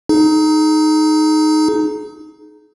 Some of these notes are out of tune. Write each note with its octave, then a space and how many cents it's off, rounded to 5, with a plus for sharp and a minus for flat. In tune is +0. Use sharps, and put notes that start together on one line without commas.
D#4 -5 G#4 +35